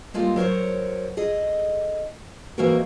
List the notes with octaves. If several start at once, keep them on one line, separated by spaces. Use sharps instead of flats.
G3 G#3 A#3 F4 A4
F#3 A#4 C5 C#5
G#4 A4 D#5
E3 G#3 A#3 C4 F#4 A#4